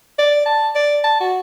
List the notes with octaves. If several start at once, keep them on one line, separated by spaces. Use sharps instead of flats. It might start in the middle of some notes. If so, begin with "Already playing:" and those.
D5
A5
D5
A5
F#4